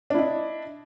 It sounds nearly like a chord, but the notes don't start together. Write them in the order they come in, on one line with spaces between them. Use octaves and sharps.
D4 E4 D#5